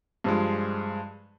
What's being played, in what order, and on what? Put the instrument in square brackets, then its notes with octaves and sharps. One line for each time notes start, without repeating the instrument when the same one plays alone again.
[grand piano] G2 F3 G#3